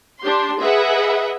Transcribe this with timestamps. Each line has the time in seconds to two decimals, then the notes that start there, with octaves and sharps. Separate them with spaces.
0.22 D4 G4 C6
0.61 G#4 B4 D#5 E5 F#5